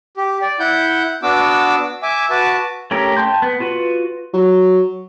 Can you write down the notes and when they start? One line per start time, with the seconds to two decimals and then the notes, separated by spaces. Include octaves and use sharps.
0.17 G4
0.42 D5
0.60 E4 F#5 G6
1.23 B3 D4 F#4 D6 E6
2.03 E5 G#5 D6
2.30 F#4 B4 A5 D6
2.91 A3 C#4 G4 A#4
3.17 G5 A5 C6 G6
3.42 B3
3.60 F4 F#4 B4
4.33 F#3